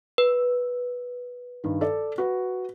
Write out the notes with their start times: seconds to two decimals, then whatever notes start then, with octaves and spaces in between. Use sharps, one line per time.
0.18 B4
1.64 G2 D#3
1.81 A4 D5
2.18 F#4 B4